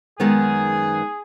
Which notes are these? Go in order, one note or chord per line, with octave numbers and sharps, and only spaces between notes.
F#2 D#3 G#3 B3 G#4